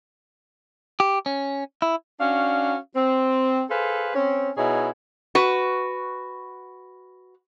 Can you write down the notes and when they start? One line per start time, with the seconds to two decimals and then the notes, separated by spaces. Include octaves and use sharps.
1.00 G4
1.26 C#4
1.82 E4
2.20 C#4 D4 F#4 F5
2.96 C4
3.70 G#4 A4 B4 C5 F5
4.15 C4 C#4
4.57 B2 D#4 E4 G#4 C#5
5.35 F#4 B4